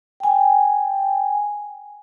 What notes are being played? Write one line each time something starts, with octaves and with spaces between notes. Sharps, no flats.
G5 G#5